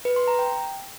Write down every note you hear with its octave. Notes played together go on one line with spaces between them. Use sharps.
B4
C6
A#5
G5